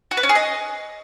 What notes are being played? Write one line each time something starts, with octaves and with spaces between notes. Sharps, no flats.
F#4
B4
C#4
G#4
D#5